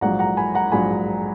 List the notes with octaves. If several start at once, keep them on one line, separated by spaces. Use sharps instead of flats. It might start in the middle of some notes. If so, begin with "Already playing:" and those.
A#1 G#2 F#3 F#5 A#5
F#5 A#5
G#5 B5
F#5 A#5
A#1 G#2 F#3 G#5 B5